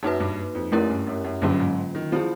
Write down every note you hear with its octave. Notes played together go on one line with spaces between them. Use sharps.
F#2 A#3 D#4 F#4 B4
G2
F2
F#2 A3 C#4 E4 G4 A#4
G2
F#2
F#2
G2 D3 F#3 A#3 C#4 F4
G#2
D#3
F3 C4 E4 G#4